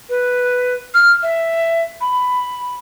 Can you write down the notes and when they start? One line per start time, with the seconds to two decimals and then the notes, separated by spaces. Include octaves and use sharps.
0.09 B4
0.95 F6
1.23 E5
2.01 B5